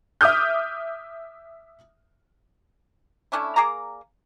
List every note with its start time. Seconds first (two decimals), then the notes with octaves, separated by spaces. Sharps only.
0.21 E5 D6 D#6 F6 G6
3.32 A3 C#4 D4 E4
3.56 A#3 G#4 D5 A#5